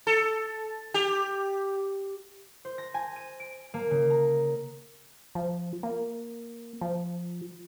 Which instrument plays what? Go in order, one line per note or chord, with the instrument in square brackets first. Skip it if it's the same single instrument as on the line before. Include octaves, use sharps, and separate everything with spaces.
[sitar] A4
G4
[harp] C5
A#6
G#5
D#7
D7
A#3
C#3
A#5
[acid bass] F3
A#3
F3